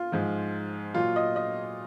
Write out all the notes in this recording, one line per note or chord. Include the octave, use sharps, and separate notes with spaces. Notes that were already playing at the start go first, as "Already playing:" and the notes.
Already playing: F4
G#2 F3
A#2 F#3 F4
D#5
D#5